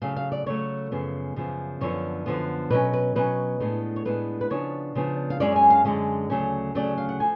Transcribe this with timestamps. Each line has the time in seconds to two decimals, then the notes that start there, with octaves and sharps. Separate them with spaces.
0.02 C#3 F#3 A3 F5
0.16 F5
0.32 D5
0.46 C#3 F#3 A3 C#5
0.91 F#2 C#3 F3 B3
1.36 F#2 C#3 F3 B3
1.81 F#2 D3 F3 B3 C#5
2.26 F#2 D3 F3 B3
2.70 B2 F#3 C#4 B4
2.93 B4
3.16 B2 F#3 C#4 B4
3.60 A2 G#3 B3 D4
3.96 C#5
4.05 A2 G#3 B3 D4 B4
4.41 B4
4.50 C#3 F3 B3 D4 C#5
4.95 C#3 F3 B3 D4
5.30 F5
5.40 F#2 D3 G#3 C#4 D5
5.56 G#5
5.70 F5
5.85 F#2 D3 G#3 C#4
6.30 D2 C#3 F#3 A3 C#4
6.75 D2 C#3 F#3 A3 C#4 D5
6.98 F5
7.09 F#5
7.20 F3 A3 G#5